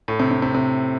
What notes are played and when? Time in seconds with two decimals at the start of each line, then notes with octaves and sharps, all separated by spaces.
0.08 A2
0.20 C3
0.31 C3
0.42 C3
0.55 C3